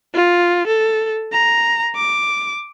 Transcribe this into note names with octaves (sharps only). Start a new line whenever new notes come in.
F4
A4
A#5
D6